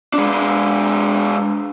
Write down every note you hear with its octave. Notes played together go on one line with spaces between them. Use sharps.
G#3 D4